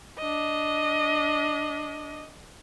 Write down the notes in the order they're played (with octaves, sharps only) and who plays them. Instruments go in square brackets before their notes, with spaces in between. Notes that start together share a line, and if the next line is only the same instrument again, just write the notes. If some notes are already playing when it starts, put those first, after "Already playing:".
[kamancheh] D4 D#5